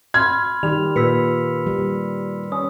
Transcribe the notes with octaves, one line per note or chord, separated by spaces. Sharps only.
B5 C6 F6 G#6
D#3 G3 G4 F7
A#2 B4 E6 B6 C#7
G3
C#4 D#6